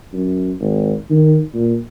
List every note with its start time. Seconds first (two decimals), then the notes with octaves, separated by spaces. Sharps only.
0.13 F#2
0.60 G#1
1.10 D#3
1.54 A#2